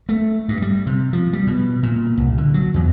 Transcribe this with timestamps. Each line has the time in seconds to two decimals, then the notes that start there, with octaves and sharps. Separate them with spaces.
0.09 A3
0.48 G2
0.62 G3
0.87 C3
1.13 F3
1.33 G3
1.47 B2
1.83 A#2
2.18 C2
2.37 D3
2.54 F#3
2.74 E2